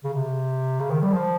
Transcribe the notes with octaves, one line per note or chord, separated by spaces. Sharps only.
C#3
C3
C#3
D#3
G3
F3